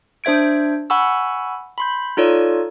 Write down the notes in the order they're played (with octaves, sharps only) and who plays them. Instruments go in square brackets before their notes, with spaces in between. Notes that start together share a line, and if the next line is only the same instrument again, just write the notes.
[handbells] D4 C5 E5 G#6 D7
F#5 G#5 B5 C#6 E6
B5 C6 G6
D#4 F4 A4 C#5 D5